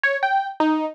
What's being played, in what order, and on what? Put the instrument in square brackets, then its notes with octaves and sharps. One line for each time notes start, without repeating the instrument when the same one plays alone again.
[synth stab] C#5
G5
D#4